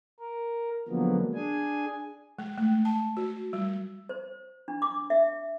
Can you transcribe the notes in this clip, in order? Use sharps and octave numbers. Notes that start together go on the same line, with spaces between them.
A#4
D3 F3 F#3 G#3 A#3 B3
D4 G#4 G#5
G#3
A3
A5
F#4
G3
C5
D4
D6
E5